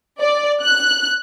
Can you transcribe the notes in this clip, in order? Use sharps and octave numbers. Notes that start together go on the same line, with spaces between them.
D5
F#6